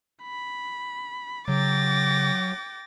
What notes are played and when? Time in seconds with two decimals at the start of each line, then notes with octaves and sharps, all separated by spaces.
0.22 B5
1.48 C#3 F#3 G5 D6 A6 A#6